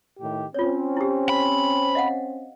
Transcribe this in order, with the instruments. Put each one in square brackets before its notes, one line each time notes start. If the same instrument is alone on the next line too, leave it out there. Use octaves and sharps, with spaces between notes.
[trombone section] A2 D#3 G4
[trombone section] C4 C#4 [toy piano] F4 C#5
[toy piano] E4 G4
[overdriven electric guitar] B5
[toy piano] D#5 F5 F#5